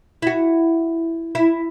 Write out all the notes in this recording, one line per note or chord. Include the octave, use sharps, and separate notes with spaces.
E4 F#4
E4